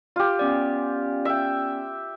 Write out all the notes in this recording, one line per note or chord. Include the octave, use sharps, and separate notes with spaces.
F4 G4
B3 C#4 D5
E5 G5